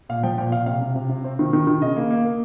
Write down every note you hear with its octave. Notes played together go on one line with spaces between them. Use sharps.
A#2 F5
F3 G5
A#2 G5
A#2 F5
C3 F5
C3
C3
C3
C4
D#3
D#3
D#3
C#3 D#5
A#3
A#3
A#3